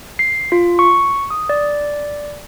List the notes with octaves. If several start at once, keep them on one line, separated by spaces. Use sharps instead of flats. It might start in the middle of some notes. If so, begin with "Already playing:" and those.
C7
F4
C#6
D#6
D5